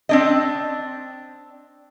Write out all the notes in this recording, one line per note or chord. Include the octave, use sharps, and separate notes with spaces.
C4 D4 D#5